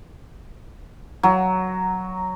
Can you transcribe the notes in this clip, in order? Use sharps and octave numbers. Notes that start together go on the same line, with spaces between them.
F#3